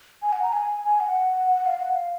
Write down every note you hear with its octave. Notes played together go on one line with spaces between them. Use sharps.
G#5
F#5
A#5
G#5
G#5
F#5
F5
F#5
F5